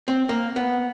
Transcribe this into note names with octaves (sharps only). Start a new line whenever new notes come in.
C4
A#3
B3